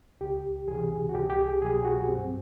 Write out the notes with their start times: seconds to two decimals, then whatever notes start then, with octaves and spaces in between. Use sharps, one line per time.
0.21 C#2 G4
0.68 C3 E3 G#4
1.09 F#4
1.14 C2 G4
1.30 G4
1.38 G#4
1.61 B2 F#3 G#4
1.85 F#4
2.08 G2 C4